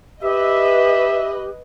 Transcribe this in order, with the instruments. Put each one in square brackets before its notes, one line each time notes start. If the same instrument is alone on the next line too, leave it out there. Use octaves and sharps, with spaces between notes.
[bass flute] G4 [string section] B4 D#5 [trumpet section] E5